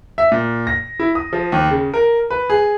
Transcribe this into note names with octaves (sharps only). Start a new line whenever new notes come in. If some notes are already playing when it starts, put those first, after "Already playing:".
E5
A#2
A#6
E4
D#6
F3
D#2
C#3
A#4
B4
G#4